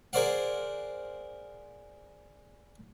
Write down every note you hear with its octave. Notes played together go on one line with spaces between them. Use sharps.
G#4 A#4 C5 D5 F5 F#5